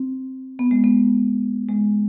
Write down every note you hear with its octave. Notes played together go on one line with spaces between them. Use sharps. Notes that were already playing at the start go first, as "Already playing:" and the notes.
Already playing: C4
B3
G#3
B3
G#3